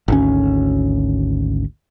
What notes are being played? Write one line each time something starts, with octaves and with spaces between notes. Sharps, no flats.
G#1 D2 C#4